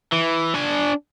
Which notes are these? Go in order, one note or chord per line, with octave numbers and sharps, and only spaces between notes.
E3
D4 G#5